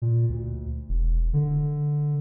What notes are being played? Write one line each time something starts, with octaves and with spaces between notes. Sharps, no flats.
A#2
D2
E1
D3